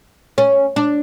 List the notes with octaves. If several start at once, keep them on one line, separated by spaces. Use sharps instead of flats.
C#4
D4